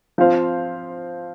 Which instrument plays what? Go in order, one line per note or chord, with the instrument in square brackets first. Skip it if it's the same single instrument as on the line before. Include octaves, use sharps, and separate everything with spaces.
[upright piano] F3 C4 F4 C5 F5